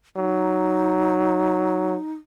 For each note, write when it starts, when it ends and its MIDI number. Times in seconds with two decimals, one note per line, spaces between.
0.16 1.96 54
0.16 2.13 63